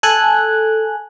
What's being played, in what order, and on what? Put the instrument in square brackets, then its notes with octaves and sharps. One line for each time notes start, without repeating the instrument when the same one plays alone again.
[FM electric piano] A4 G#5 F#6